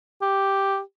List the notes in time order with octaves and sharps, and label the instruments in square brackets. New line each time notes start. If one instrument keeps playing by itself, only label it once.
[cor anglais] G4